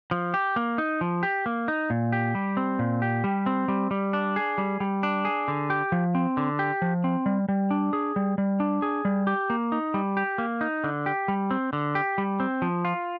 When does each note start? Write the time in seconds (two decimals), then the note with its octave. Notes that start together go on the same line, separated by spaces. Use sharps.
0.11 F3
0.34 G4
0.56 A#3
0.78 D#4
1.01 F3
1.23 G4
1.46 A#3
1.68 D#4
1.90 A#2
2.12 G4
2.35 G3
2.57 C4
2.79 A#2
3.02 G4
3.24 G3
3.46 C4
3.68 G3
3.91 G3
4.13 D4
4.36 G#4
4.58 G3
4.80 G3
5.03 D4
5.25 G#4
5.48 D3
5.70 G4
5.92 F3
6.15 C4
6.37 D3
6.59 G4
6.82 F3
7.04 C4
7.26 G3
7.49 G3
7.71 D4
7.93 G#4
8.16 G3
8.38 G3
8.60 D4
8.82 G#4
9.05 G3
9.27 G4
9.50 A#3
9.72 D#4
9.94 G3
10.17 G4
10.38 A#3
10.61 D#4
10.84 D3
11.06 G4
11.28 G3
11.51 C4
11.73 D3
11.95 G4
12.18 G3
12.40 C4
12.62 F3
12.85 F4